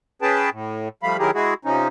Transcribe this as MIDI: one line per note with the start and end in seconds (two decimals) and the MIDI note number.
0.22 0.50 61
0.22 0.50 68
0.22 0.50 71
0.22 0.50 79
0.22 0.50 81
0.52 0.88 45
1.03 1.17 53
1.03 1.17 55
1.03 1.17 57
1.03 1.17 77
1.03 1.17 83
1.19 1.31 51
1.19 1.31 54
1.19 1.31 64
1.19 1.31 67
1.19 1.31 68
1.19 1.31 70
1.35 1.54 56
1.35 1.54 64
1.35 1.54 66
1.35 1.54 68
1.65 1.88 48
1.65 1.88 53
1.65 1.88 61
1.65 1.88 63